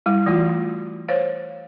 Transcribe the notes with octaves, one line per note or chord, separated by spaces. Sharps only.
G3 E4
E3 A3 F4 F#4
C5 C#5 F5